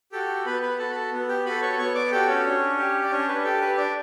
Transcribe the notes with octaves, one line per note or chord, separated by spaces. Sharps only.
F#4 G4 A4 G5
B3 B4 B5
B4 B5
F#4 A4 A5
B5
A4 A5
B3
G4 G5
F#4 A4 B4 B5
C#5 C#6
B3 C#5 C#6
D5 D6
F#4 G4 A4 G5
C#4 C#5
D4
G4
D5
C#4 D4 C#5
B4
G4 A4
B4
D4 D5